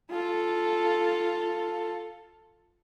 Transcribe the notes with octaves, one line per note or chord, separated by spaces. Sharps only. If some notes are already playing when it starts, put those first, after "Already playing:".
F4 A4